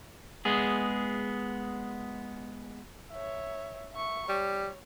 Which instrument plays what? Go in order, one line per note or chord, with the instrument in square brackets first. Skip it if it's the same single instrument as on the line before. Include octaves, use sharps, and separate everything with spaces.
[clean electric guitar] G#3 B3 G#4
[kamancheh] C#5 E5
E5 C#6
[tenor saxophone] G3 [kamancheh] C#5